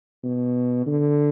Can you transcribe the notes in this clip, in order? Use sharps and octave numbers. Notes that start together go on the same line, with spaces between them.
B2
D3